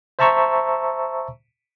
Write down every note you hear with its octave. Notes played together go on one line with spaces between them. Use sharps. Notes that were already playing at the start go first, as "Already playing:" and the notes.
C5 E5 A5 A#5 C#6 E6